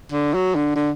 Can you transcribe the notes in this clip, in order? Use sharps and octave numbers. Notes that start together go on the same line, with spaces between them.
D3
F#3
D3
D3